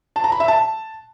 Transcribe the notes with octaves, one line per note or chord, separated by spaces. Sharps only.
A5
A#5
B5
E5
A5